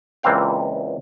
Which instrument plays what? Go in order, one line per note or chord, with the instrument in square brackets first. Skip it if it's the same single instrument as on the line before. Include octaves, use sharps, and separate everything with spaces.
[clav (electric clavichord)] C#2 A#2 E3 C4 F5 G5